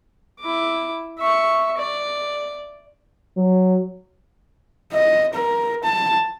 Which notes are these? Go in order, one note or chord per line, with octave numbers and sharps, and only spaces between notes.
E4 D6
E5 C#6
D5
F#3
D#5
A#4
A5